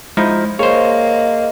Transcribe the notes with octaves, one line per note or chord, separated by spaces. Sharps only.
F3 G#3 D#4 E4
A#3 G#4 C5 C#5 D#5